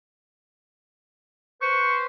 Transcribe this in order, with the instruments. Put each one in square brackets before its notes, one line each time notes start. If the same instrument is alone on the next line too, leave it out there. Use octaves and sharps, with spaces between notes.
[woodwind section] B4 C5 [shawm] C#6